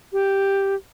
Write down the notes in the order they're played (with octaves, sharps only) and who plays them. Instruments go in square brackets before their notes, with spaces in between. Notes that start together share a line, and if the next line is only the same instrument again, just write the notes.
[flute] G4